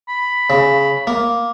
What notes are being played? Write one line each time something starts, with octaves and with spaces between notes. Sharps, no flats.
B5
C#3
A#3